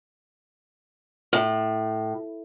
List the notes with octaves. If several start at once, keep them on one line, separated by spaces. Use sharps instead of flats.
A2